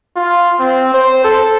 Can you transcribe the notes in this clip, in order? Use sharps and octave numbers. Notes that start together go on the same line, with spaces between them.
F4
C4
C5
A4